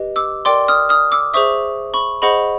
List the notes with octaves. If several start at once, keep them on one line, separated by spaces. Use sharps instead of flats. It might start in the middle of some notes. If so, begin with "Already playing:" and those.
Already playing: G4 B4 D#5
D6 E6
A#4 D5 G5 C6 D6
D#6 F6
D#6 F6
D6 E6
G#4 C5 E5 C#6 D#6
B5 C#6
G#4 C5 D#5 F#5 B5 C#6